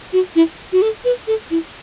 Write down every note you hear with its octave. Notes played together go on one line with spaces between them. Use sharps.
F#4
E4
F#4
A4
B4
A4
E4